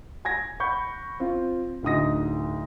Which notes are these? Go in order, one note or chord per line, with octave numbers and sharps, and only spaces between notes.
G#5 G#6 A#6
F#5 B5 C#6 G6
C4 F4
D1 D2 D#4 D#6 A#6